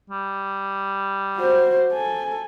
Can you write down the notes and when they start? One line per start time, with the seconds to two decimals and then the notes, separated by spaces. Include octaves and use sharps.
0.10 G3
1.37 F#4 C5
1.93 A4 G#5